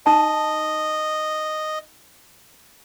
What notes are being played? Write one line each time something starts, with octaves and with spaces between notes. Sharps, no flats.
D#4 D#5 A5